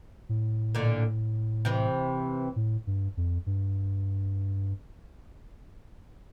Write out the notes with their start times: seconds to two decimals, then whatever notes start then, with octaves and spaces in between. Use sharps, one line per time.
0.29 A2
0.75 A#2 D3
1.65 C3 E3
2.56 A2
2.87 G2
3.17 F2
3.46 G2